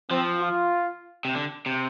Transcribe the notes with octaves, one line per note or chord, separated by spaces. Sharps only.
F3 C4
F4
C3
D3
C3